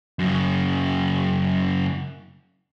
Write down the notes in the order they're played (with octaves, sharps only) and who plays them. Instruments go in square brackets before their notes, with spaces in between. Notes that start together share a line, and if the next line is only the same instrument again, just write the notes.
[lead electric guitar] F#2 C#3